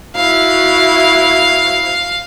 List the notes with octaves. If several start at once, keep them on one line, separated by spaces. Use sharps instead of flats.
E4 F#4 F5